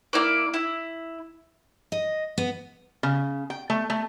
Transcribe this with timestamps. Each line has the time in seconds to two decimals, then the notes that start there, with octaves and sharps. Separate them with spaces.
0.13 A#3 E4 D5
0.54 E4
1.92 D#5
2.38 B3
3.03 C#3
3.50 G5
3.70 A3
3.90 A3